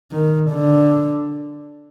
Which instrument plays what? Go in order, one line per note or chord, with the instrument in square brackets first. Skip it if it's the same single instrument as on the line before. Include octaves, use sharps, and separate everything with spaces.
[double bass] D#3
D3